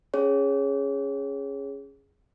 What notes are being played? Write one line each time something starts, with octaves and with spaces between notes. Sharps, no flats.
C#4 G#4 C#5